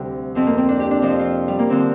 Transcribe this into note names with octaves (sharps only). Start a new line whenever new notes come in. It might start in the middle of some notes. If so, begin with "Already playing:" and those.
Already playing: D2 C3 G3
F2 F3 C4
A#3
C4
D4
G4
D4
F2 C3 F3 C4
F4
G3
A#3
D3 F3 C4